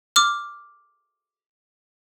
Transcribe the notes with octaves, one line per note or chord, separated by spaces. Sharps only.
D6 F6